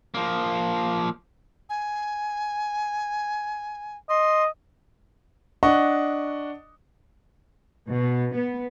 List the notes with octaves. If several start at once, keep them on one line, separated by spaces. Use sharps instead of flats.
F3 A#3
G#5
D#5 C6
D4 D#5 F#5 C#6
B2
B3